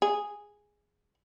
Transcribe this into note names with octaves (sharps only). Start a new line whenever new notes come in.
G#4